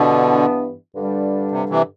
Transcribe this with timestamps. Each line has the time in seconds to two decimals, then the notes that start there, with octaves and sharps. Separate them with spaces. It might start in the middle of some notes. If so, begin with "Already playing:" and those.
Already playing: G2 B2 D3 E3 B3 D4
0.95 G2 D3 G3 D4
1.51 C3
1.69 C3 E3